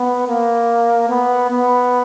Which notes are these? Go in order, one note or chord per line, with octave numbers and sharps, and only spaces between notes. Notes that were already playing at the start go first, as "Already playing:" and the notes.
Already playing: B3
A#3
B3
B3